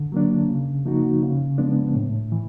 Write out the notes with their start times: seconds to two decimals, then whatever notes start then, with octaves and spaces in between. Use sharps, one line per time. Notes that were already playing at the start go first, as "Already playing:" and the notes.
Already playing: D3
0.12 F#3 A#3 D4
0.48 C#3
0.86 F3 A#3 D#4 F#4
1.23 C#3
1.58 F3 G#3 B3 D4
1.95 A2
2.32 E3